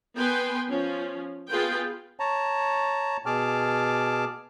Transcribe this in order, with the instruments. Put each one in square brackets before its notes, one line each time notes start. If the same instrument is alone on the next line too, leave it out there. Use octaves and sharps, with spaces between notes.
[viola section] B3 B4 G5 G#5 C6
F3 C#4
B3 F4 G#4 B4 G5
[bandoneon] C#5 A5 A#5
B2 G#4 A5 D6 F6